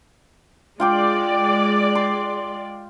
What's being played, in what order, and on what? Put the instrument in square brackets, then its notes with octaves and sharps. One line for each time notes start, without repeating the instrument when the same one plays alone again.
[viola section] G#3 D5 [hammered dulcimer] F4 G5 D6
[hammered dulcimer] C6